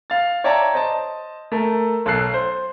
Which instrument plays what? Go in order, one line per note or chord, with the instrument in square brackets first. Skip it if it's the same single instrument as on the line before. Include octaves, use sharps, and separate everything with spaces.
[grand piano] F5 A6
C#5 D5 E5 G5 A5 A#5
C5 D#5 A5
A3 A4 A#4
B1 A4 F#6 C7
C5